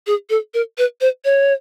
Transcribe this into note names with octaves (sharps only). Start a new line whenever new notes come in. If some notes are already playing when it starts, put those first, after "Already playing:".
G#4
A4
A#4
B4
C5
C#5